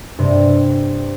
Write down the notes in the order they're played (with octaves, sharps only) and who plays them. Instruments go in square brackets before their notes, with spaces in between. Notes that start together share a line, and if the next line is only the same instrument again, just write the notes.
[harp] G2 C3